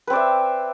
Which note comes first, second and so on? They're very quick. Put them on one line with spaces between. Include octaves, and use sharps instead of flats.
B4 C4 D5 E5